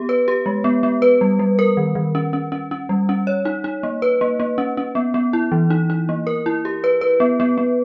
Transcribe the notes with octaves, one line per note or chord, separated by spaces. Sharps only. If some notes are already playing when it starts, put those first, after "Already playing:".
Already playing: B3 G4
B4
G4
G#3
B3
B3
B4
G3
G3
A#4
D#3
D#3
C#4
C#4
C#4
C#4
G3
C#4
C#5
D#4
D#4
A#3
B4
A#3
A#3
C#4
C#4
B3
B3
E4
E3
D#4
D#4
A#3
A#4
E4
G4
B4
B4
B3
B3
B3